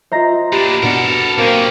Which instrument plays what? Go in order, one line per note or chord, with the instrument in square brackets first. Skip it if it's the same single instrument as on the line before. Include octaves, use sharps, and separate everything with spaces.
[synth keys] F4 D#5 E5 [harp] C5 A#5 A#6
[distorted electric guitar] A#3 D4 [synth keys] G4 B5
[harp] B2 D4 [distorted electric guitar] A4 A#4
[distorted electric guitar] B1 C#4 [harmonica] A#3 C4